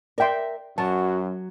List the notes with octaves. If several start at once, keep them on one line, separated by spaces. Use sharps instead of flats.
A#4 D5 E5 G5 C6
F#2 F#3 F#4 A5